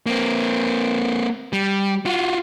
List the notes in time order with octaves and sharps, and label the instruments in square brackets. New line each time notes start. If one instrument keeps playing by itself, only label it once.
[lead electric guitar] A#3 C4
G3
F4 F#4